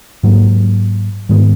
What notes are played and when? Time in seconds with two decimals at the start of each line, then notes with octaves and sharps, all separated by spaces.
0.23 G#2 F#3 A#3
1.29 G#2 D#3 G#3 B3